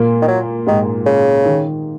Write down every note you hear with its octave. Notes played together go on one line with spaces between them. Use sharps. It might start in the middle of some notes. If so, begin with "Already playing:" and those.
Already playing: A#2 A#3
D#3
F#3
G#2 D#3 G#3
C#3
D#3